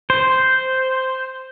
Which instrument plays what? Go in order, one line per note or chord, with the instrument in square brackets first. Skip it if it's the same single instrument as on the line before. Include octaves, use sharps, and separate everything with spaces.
[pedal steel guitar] C5